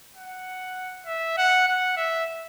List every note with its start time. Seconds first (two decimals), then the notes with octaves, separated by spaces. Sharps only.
0.16 F#5
1.06 E5
1.37 F#5
1.67 F#5
1.97 E5